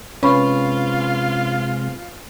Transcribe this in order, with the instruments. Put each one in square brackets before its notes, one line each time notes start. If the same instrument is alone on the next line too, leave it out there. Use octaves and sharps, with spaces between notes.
[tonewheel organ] C3 G#3 C4 [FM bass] C#4 [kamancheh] F4 [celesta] B4 B5 C#6